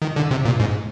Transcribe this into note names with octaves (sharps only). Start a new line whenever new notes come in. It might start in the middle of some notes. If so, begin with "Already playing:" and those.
D#3
D3
C3
A#2
G#2